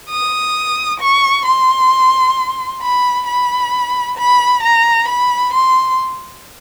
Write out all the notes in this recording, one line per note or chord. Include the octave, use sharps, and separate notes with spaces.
D#6
C#6
C6
B5
B5
B5
A#5
B5
C6